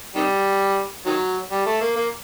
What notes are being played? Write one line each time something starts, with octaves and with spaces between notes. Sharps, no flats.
C3 D#3 G3
D#3 F#3
G3
A3
A#3
A#3